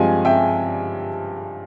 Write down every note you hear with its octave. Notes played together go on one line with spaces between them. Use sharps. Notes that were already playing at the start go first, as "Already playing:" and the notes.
Already playing: G2 F3 G#3 C4 F5 G#5
E5 G5